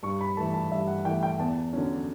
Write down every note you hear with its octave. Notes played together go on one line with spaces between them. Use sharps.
G2 C#6
B5
E3 A3 A5
A5
G2 E5
F#5
E3 A3 G5
G5
E2 A5
D3 F#3 C#4